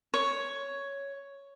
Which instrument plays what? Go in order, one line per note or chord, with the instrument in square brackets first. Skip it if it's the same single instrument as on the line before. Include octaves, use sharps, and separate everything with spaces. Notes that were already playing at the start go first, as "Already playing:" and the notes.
[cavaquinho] C#5